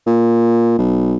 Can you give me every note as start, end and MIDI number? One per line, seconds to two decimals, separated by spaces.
0.07 0.76 46
0.79 1.17 35